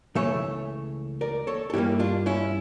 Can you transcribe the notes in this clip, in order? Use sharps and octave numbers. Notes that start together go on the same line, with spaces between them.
C#2 C#3 E3 A3 C#5 E5
A#4 D5
A4 C#5
A4
G2 E3 G3 A#3 E4 G4
D4 F4
C#4 E4